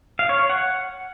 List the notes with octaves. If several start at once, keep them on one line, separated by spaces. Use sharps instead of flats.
F5
C#5
C#5
F#5